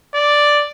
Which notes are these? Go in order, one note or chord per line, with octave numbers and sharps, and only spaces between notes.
D5